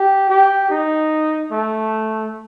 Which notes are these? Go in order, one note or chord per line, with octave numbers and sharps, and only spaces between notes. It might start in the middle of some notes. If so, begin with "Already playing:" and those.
Already playing: G4
G4
D#4
A3